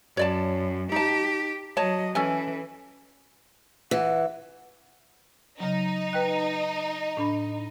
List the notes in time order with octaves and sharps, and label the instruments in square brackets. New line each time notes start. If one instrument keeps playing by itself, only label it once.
[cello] F#2 [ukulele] C#5 D5 A5
[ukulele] D#4 A5 [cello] G4
[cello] F#3 D#5 [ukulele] C#5 A5
[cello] E3 [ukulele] C#4 A4 G#5
[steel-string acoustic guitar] E3 [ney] F#5
[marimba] C#3 F#3 [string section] D#4
[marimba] B4 G5 F#6
A2 D4 B5